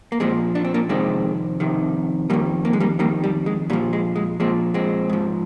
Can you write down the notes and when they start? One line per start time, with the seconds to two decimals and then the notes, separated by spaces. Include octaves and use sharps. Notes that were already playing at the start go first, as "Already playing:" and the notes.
0.12 A#3
0.20 A#2 F3 G#3 C4
0.55 D4
0.65 C4
0.74 A#3 D4
0.89 F2 C3 D#3 G#3 C4
1.60 F2 C3 D#3
2.30 F2 D#3 G3 A#3
2.65 A#3
2.73 G#3
2.80 G3 A#3
2.99 F2 D#3 G3 A#3
3.24 G3
3.46 G#3
3.70 A#2 G3
3.73 F3
3.93 G#3
4.16 G#3
4.40 A#2 F3 G#3 C4
4.74 G#3 C4
5.10 G#2 F3